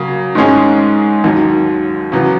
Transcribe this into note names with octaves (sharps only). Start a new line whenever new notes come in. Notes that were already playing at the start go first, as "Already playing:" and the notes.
Already playing: C#3 F#3 A#3
G#2 D#3 G#3 C#4 G#4
D#2 D#3 F#3
E2 C#3 F#3 B3